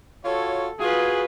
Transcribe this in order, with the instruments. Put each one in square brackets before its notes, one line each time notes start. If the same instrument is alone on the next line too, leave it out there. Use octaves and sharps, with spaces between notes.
[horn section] F4 F#4 C#5 [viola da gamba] A4
[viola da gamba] F4 B4 [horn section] F#4 G#4